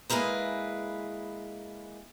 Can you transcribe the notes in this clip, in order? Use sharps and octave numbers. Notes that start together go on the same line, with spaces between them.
G#3 A#3 E4 G#4 B4